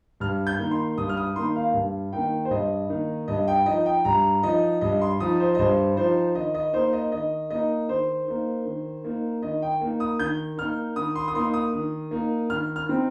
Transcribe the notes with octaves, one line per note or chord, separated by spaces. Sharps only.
G2 F6
G6
D#3 A#3 D#4
C6
G2 D#6
F6
D#6
D#3 A#3 D#4 C6
F5
G2
D#3 A#3 D#4 G5
C5
G2 D#5
D#3 A#3 D#4
G2 D#5
G5
F3 D#4 D#5
G5
G2 A#5
F3 D#4 D#5
G2 D#5
C6
F3 D#4 D#6
C5
D#5
G2 C5
F3 D#4 C5
D#3 D#5
D#5
A#3 D#4 C5
D#5
D#3 D#5
A#3 D#4 D#5
D#3 C5
A#3 D#4
D#3
A#3 D#4
D#3 D#5
G5
A#3 D#4
D#6
D#3 G6
A#3 D#4 F6
D#3 D#6
C6
D#6
A#3 D#4 C6
D#6
D#3
A#3 D#4
D#3 F6
F6
C4 D#4